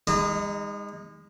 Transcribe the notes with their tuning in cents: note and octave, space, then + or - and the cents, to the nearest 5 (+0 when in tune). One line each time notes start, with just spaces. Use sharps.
G#3 -35 D#4 +10